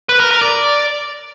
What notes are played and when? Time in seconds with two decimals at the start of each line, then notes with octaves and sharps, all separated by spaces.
0.09 B4
0.20 A#4
0.31 A#4
0.41 D5